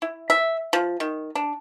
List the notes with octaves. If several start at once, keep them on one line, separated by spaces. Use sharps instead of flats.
E4
E5
F3
D#3
D4